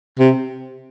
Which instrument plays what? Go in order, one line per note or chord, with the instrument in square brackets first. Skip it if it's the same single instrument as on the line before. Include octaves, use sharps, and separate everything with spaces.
[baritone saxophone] C3